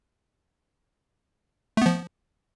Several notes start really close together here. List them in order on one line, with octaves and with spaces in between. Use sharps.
A3 B3 F3